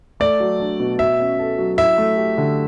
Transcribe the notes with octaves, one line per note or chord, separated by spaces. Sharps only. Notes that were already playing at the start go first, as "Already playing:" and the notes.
A3 D5
F#3
D4
B2
F#4 E5
C#4
A4
F#3
E4 E5
A3
G4
D3